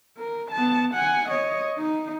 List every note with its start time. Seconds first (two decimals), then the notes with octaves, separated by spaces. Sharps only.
0.17 A#4
0.52 B3 A5
0.94 F#5 G#5
1.29 C#5 D#5
1.78 D#4